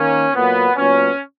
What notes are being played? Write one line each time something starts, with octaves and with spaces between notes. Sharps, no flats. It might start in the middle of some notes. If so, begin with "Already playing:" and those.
Already playing: D#3 A#3 C#4
A#2 F#3 A#3 B3
A#2 F#3 B3 C#4